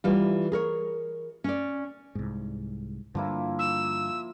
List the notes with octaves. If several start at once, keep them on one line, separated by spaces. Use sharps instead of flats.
E3 G3 F4
G#4 A#4 C#5
C#4 D5
C2 G#2
G2 D3 F3 A#3 E4
E6